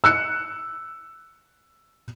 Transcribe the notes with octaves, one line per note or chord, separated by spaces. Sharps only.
E6 F#6 C#7